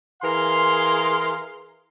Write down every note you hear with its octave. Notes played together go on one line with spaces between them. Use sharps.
E3 G#4 A#4 F5 C6